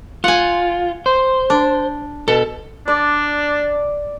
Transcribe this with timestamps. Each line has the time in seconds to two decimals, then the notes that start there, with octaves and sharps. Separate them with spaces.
0.24 F4 F#5 G#5
1.06 C5
1.50 D4
2.28 B2 A4
2.88 D4 D5